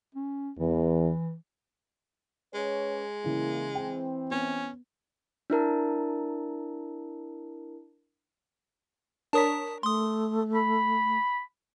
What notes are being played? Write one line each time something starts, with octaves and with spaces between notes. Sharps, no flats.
C#4
E2 E3
G#3 C#4 B4 C#5
C#3 E3 A#3 E4
E3 C4 G5
B3 C#4
D4 E4 A#4 A5
D4 A#4 C#5 A5 D#6 B6
A3 C6 D#6
B5